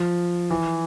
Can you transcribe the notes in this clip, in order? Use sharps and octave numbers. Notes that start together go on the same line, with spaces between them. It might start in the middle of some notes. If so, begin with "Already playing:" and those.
Already playing: F3
E3